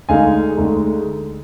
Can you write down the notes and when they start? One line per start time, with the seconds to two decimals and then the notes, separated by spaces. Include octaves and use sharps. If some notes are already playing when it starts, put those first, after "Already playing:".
0.09 D2 D3 G#3 D#4 F5 G#5
0.57 D2 D3 G#3 D#4